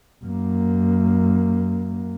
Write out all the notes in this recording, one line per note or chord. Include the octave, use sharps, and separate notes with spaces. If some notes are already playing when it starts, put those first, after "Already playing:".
F#2 A#3